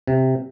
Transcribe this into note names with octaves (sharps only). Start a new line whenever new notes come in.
C3